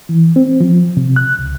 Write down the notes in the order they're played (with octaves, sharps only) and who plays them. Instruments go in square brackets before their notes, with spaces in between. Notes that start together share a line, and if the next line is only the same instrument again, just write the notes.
[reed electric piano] E3
C4
F3
C3
F#6
C#2